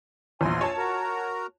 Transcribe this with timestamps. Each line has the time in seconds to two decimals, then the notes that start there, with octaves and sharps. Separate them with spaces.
0.41 A#1 E2 G#5 C6
0.61 C#5 A5
0.77 F#4 A#4 A#5